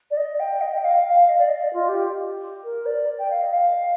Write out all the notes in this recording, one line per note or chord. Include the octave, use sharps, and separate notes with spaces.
D5
D#5
G5
D#5
G5
F5
F5
D#5
D5
D#5
F4
G4
A#4
D5
G5
F5
D#5
F5